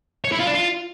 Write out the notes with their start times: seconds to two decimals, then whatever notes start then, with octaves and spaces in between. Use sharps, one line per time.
0.24 C#5
0.32 E4
0.39 F4
0.47 D4
0.54 F4